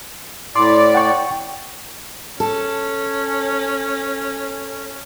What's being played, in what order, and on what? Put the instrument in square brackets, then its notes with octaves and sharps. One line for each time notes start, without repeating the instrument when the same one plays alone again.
[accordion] A2 D5 [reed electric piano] C6 D6
[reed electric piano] F#5 G5 C#6
[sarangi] C#4 [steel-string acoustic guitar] A4